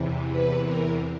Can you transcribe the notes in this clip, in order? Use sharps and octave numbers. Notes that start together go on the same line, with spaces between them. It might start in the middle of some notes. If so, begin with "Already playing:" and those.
Already playing: E2 C3 E3
B4
A#4